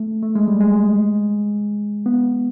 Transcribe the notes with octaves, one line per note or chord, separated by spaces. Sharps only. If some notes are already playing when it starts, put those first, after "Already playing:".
Already playing: A3
A3
G#3
G3
G#3
B3